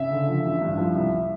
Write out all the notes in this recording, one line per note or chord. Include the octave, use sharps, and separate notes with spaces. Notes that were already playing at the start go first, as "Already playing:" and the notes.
Already playing: C#3 E5
D3
F3
A1
G2
F3
C2